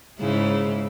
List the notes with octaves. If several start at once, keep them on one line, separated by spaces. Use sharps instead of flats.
G#2 C#3 E4